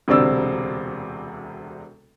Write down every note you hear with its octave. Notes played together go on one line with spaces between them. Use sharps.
E1 D2 C3 C4 D5 E6